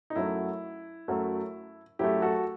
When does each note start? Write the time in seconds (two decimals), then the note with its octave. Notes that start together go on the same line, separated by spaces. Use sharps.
0.10 D#4
0.15 F#2 F#3 A3 E4
1.08 F#2 F#3 A3
1.99 F#2 F#3 A3 E4 G4
2.22 F#4 A4